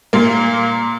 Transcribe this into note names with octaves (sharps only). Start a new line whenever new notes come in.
A#2 A#3